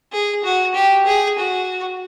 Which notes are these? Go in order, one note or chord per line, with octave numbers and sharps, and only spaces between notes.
G#4
F#4
G4
G#4
F#4